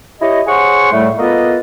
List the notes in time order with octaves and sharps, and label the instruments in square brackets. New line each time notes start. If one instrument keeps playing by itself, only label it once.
[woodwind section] E4 G4 C#5 D#5
G#4 C5 C#5 F#5 C6 C#6
A2 G3 A3
A#3 B3 F4 A4 B4 D#5